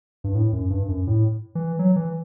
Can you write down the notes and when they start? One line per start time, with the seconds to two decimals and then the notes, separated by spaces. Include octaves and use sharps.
0.24 G2
0.35 A2
0.53 F#2
0.70 G2
0.88 F#2
1.07 A2
1.55 E3
1.79 F#3
1.96 E3